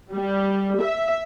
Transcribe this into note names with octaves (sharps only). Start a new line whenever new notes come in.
G3
E5